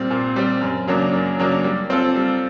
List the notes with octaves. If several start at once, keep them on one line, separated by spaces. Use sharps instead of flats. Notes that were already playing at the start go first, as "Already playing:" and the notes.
Already playing: A#2 G3 C4
A#2
G3 C4
F#2
C#3 F#3 A#3 D4
F#2
C#3 F#3 A#3 D4
G3
C4 F4 A4
G3